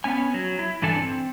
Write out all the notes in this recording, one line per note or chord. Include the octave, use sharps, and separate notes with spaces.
B3 C#4 G#5
F#3
E4
G2 E3 D4 A4 G#5
C4